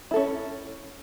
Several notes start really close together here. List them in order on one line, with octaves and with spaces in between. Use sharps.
E4 A4 C#4